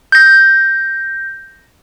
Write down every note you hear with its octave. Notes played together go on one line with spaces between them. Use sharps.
G6 A#6